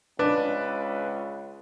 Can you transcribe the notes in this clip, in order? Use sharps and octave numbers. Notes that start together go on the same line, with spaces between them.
C#2 D4 B4